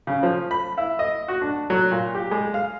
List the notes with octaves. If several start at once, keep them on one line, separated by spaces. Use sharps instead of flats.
C#3
F3
B5
E4
D#5
F#4
D4
F#3
A#2
G4
G#3
F5